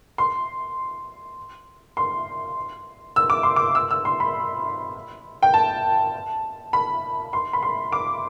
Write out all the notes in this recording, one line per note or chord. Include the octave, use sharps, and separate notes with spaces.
C6
C6
E6
D6
C6
D6
E6
E6
C6
B5
G5
A5
B5
C6
B5
C6
D6